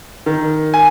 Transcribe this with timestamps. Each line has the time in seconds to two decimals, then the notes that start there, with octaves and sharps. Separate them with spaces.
0.26 D#3
0.74 G#5